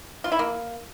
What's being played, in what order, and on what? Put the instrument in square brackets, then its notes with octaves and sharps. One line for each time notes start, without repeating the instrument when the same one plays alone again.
[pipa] F4
E4
A#3